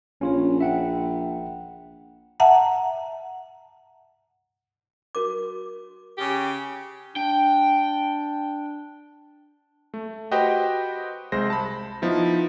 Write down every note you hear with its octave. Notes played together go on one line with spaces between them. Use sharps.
A#1 C#4 F4 C#5
E5 F#5 G5
E5 F#5 A5 A#5
F#4 A#4 D6
C#3 G4
D4 G5
A3
F#4 G4 B4 C5 D#5 G5
C2 G#3 C5 A#6
A5 B5
F3 B3 D#4 E4